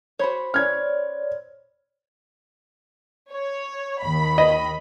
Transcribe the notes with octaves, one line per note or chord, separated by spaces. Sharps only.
F#4 C5 C#5 B5
C#4 C#5 D5 F6 G#6
C#5
D#2 D#3 B5
D#5